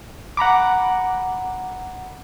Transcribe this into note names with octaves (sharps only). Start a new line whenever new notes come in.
F#5 A#5 B5 D6